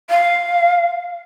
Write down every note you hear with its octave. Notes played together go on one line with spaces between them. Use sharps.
F5